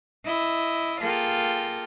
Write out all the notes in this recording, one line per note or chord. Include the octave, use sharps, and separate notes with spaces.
E4 D#5 E6
A#3 F4 G#4 A4 G5